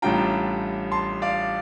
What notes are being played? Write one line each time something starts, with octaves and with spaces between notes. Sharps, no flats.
A1 A2 G3 D4 F4 G5 A#5
A5 C6
D5 F5